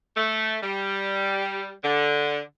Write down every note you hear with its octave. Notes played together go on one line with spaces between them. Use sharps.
A3
G3
D3